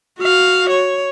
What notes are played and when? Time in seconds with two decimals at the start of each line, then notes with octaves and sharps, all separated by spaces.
0.19 F#4 F5
0.70 C#5